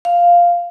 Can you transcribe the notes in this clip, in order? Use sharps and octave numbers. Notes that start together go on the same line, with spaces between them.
F5